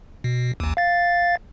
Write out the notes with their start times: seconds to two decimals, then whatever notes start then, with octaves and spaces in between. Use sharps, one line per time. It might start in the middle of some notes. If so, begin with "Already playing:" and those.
0.24 B2
0.60 A1 D#2
0.77 F5 A6